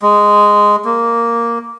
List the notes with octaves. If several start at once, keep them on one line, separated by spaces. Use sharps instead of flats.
G#3
A#3